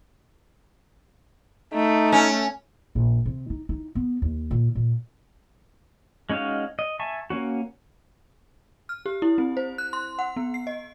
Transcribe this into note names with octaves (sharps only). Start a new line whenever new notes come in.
A3 D#4
C#4
A#1
C3
D#4
D#4
B3
D#2
A#2
A#2
G#3 C#4 D#4 F#4 F5
D#5
E5 G#5 A5 C#6
A#3 C#4 F#4
F6
G4
E4
C4
C5
F#6
C6
F#5
B3
C7
D#5